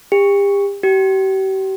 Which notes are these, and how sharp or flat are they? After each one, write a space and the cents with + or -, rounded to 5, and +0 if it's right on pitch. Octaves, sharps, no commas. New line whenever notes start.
G4 +35
G4 -40